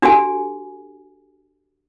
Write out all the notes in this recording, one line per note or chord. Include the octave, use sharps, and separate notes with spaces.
D4 F#4 G4 A4 G#5